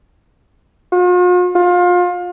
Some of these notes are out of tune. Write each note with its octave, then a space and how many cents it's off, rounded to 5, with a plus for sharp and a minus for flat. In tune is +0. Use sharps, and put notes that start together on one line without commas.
F4 +45
F4 +30